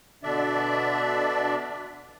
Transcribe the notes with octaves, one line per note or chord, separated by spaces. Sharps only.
B2 D3 D4 D5 E5